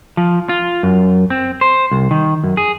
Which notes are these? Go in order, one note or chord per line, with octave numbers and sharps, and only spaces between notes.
F3
F4
F#2
C4
C5
C2
D#3
F#2
G#4